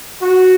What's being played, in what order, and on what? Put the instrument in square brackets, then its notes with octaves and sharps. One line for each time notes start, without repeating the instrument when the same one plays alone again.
[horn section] F#4